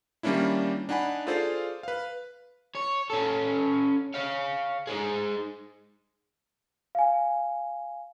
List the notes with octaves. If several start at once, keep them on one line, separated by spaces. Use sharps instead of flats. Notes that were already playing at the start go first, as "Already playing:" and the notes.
D#3 G3 A#3 C#4 D4 E4
D4 D#4 F#5 G#5 B5
F4 G#4 A4 C5 D5 F5
B4 F5
C#5
C#4 A4
C#5 F5
D#4 G#4
F5 G#5